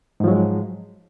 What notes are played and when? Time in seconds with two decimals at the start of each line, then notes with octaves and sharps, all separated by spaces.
0.20 G#2
0.24 F3
0.28 F#3
0.31 G#3